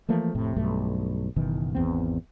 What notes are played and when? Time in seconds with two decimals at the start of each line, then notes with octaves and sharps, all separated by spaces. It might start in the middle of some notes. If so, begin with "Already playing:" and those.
0.09 E3 F3 A3 A#3
0.35 F1 A2 C3
0.56 B1 G2 A3
1.36 F#1 B2 D#3 E3
1.75 G#1 E2 B3 C4